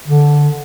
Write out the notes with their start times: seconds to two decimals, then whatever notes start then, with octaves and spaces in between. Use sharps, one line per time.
0.08 D3